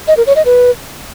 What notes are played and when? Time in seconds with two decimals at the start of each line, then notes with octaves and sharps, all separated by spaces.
0.08 D#5
0.17 A#4
0.27 C#5
0.36 D#5
0.45 B4